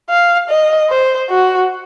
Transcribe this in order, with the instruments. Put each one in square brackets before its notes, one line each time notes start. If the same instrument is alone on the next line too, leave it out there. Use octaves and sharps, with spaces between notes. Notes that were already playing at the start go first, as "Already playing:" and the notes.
[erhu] F5
D#5
C5
F#4